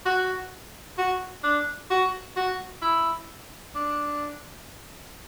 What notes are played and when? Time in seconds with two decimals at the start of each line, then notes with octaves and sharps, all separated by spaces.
0.05 F#4
0.98 F#4
1.43 D4
1.90 F#4
2.36 F#4
2.82 E4
3.75 D4